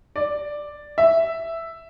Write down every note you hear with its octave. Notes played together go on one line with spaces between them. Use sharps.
D5
E5